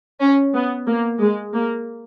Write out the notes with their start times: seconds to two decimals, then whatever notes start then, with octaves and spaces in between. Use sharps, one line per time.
0.20 C#4
0.54 B3
0.87 A#3
1.20 G#3
1.54 A#3